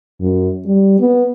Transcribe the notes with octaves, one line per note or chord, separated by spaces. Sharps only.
F#2
G3
B3